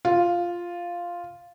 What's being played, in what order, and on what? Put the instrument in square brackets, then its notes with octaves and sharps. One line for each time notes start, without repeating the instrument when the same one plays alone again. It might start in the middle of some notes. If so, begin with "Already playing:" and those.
[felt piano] F4